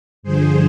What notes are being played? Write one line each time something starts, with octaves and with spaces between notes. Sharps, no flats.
G2 D3 F3 G#4 C5